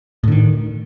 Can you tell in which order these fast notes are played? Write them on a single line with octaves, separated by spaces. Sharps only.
A2 D3 D#3